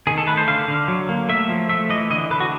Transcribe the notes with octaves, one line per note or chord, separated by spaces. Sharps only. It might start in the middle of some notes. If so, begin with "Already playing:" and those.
D#3 G#4
A4
A3 B4
C5
D3 F5
D3
F#3
A#3
A3 E5
F3
A3 E5
E3 D#5
D3 D#5
D3 B4
F#4